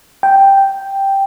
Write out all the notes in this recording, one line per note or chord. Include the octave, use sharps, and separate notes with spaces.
G5